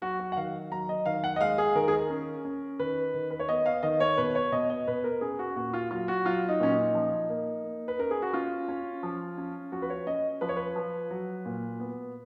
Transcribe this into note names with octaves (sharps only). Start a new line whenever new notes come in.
F#3 F#4
F#4
F#5
D#3 F5
F#3 A#5
D#5
D#3 F5
F#5
D#5
G#3 F5
G#4
D#3 A#4
G#4
A#4
C#4
C#4
D#3 B4
D#3
B4
C#5
B3 D#5
F5
D#3 D#5
C#5
B2 B4
C#5
B2 D#5
D#5
B2 B4
A#4
C#4 G#4
F#4
A#2 F#4
F4
F#3 F4
F#4
F#3 F4
D#4
A#2 C#4
D#4
F3
A#3
A#3
B4
C#4 A#4
G#4
F#4
C#4 F4
C#4
F3
C#4
F3 F#4
B4
C#5
C#4 D#5
F3 B4
C#5
B4
F3
F#3
A#2
B3